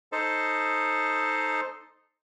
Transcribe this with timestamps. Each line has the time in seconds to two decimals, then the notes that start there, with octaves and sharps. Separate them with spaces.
0.12 D#4 A4 C5 D#5